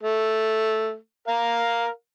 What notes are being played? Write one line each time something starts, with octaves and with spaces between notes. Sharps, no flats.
A3
A#4 F5